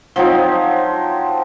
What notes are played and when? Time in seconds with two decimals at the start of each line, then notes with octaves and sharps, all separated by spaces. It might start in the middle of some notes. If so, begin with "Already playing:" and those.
0.16 F3 F#3 C4 D#4